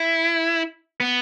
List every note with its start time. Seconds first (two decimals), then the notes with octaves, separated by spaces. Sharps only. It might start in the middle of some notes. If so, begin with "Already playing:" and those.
Already playing: E4
1.00 B3